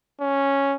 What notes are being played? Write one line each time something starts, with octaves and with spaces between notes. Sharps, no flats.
C#4